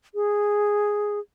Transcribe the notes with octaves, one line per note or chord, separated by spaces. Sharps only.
G#4